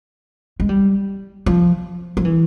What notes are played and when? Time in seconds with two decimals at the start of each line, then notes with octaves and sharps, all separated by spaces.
0.60 G#3
0.69 G3
1.46 F3
2.17 F3
2.25 E3